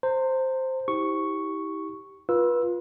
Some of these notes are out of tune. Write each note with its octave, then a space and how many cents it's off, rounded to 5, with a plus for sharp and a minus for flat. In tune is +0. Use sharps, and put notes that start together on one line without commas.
C5 +0 A#5 -35
E4 -40 G4 +0 C#6 +0
F4 +10 B4 -30 E6 +0